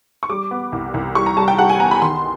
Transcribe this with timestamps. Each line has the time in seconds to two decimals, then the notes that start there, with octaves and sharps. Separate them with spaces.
0.23 C#6
0.29 G3 D6
0.51 B3
0.72 C2
0.94 C2
1.15 G3 C#6
1.26 A#5
1.37 G3 A5
1.48 G5
1.58 G3 F#5
1.69 G#5
1.80 B3 A#5
1.91 B5
2.02 D#3 C6